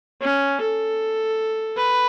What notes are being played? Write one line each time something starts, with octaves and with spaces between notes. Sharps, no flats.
C#4
A4
B4